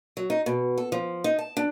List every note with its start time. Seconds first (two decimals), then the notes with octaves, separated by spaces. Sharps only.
0.17 F#3
0.30 D#4
0.46 B2
0.78 A4
0.92 F3
1.24 D#4
1.39 A5
1.57 D4